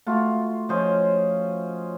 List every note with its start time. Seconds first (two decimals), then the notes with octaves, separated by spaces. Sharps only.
0.06 A3 F4 F#4
0.69 F3 C#4 C5 D#5